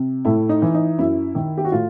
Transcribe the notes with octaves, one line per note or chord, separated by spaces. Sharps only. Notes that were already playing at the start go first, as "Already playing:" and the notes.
Already playing: C3
A2 E4
D#4
E3
D#4
F#2 E4
D#3
G4
F#4
A2 F4